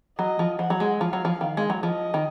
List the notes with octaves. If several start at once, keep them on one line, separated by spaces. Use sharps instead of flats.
F#3 D#5
F3
F3 F#5
F#3
G#3
F3 F5
F#3
F3
D#3
G#3
F#3
F3 D#5
D#3